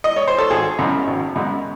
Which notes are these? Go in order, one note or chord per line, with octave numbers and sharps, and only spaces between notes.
D#5
C#5
C5
A4
G#1 G#4
F#2 C#3 G#3
G#1
F#2 C#3 G#3